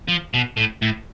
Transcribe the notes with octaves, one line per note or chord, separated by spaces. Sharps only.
F3
B2
A2
A2